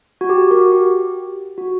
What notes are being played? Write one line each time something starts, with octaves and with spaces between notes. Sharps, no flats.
F#4
G4
F#4 A#4
G4
F#4